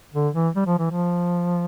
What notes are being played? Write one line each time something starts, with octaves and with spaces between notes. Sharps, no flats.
D3
E3
G3
F3
E3
F3